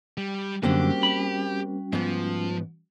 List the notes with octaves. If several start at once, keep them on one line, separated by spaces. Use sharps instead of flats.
G3
F#2 D3 G3 A#3 C4 C#4 F#4 G4
B5
G#2 F3 B3